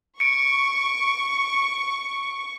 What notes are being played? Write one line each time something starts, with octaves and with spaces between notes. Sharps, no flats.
C#6 C#7 D7